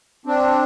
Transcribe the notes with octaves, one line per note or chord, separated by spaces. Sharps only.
C4 D4